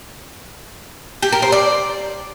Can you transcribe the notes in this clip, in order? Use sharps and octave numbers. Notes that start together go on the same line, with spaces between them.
G4
A#4
C5
D5